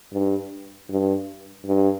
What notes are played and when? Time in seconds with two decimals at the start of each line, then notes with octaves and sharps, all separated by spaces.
0.13 G2
0.90 G2
1.66 G2